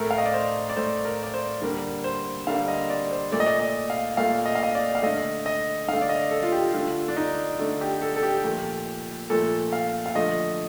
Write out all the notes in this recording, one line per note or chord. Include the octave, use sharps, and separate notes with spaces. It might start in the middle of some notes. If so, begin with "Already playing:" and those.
Already playing: A2 A3 A#4
F5
D#5
D5
C5
D5
A2 A3 C5
A#4
D5
C5
D3 G3 A#3
C5
D3 G3 A#3 F5
D#5
D5
C5
A#2 A3 D5
D#5
D5
D#5
F5
A#2 A3 F5
D#5
F5
D#5
D5
F5
D3 A3 D#5
D#5
D3 A3 F5
D5
D#5
A4
F4
G4
D3 A3 F4
D4
D#4
D3 A3
G4
A4
A4
G4
A#2 F3 A3
A#2 F3 A3 A4
F5
F5
D3 F3 A3 D#5